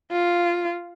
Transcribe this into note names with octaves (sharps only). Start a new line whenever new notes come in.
F4